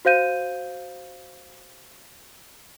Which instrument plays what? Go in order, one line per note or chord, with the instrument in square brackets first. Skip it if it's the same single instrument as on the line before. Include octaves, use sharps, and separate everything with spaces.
[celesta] F#4 C5 F5 G6 D#7